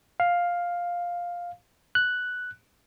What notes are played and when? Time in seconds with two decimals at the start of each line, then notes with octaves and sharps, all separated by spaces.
0.20 F5
1.95 F#6